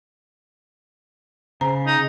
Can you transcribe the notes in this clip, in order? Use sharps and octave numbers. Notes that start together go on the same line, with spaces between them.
C#3 C5 A#5
D#4